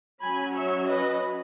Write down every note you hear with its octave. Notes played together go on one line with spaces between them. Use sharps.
F#3 C#4 G#5 B5
C#5 E5
B4 D#5